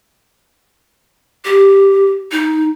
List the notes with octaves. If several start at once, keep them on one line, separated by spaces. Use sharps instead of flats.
G4
D#4